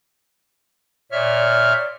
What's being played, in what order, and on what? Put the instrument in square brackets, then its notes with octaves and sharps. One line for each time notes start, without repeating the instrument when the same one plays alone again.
[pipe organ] A#2 E5 F6 [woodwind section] C#5 D5